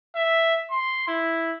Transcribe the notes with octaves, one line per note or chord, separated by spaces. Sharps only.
E5
C6
E4